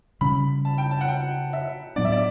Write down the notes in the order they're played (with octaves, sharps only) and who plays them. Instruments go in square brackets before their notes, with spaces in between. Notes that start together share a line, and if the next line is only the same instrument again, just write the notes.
[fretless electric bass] C#3 G3 C#4 [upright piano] B5
[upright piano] A5
G5
A5
F#5
G5
E5
[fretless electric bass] A2 F#3 B3 D4 [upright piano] D5
[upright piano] E5
D5